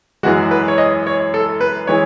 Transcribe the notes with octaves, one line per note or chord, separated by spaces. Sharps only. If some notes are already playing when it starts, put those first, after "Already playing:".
F#2 E3 G#3 F#4
B4
C#5
D#5
C#5
A4
B4
E3 G#3 C#5